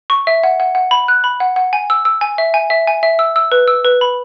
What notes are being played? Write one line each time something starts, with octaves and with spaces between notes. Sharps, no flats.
C#6
E5
F#5
F#5
F#5
B5
F#6
B5
F#5
F#5
G#5
E6
E6
G#5
E5
G#5
E5
G#5
E5
E6
E6
B4
E6
B4
B5